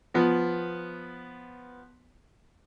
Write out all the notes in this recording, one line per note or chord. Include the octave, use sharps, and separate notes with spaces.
F3 B3